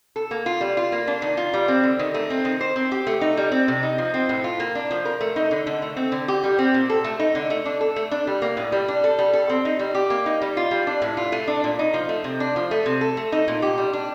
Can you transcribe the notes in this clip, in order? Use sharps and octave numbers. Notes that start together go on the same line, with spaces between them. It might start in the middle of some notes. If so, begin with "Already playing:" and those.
A4
A#3
F4
G3
F4
A#3
D4
D#3
F4
G3
C4
D3
D#3
A3
C4
D#3
C5
C4
G4
A3
D#4
G3
C4
C3
D#4
F3
C4
A2
F4
A#3
D4
F3
A#4
A3
D#4
D3
D3
A3
C4
D3
G4
G3
C4
A#2
A4
A3
D#4
D3
A3
D4
A4
A3
D4
G3
A#3
A2
G3
D4
A4
G3
A4
C4
D#4
G3
G4
A#3
D#4
G3
F4
G3
D4
A2
F4
A3
D4
A#2
D#4
F3
A3
C3
D4
F3
A3
C3
A4
A3
D#4
A#2
G4
G3
D4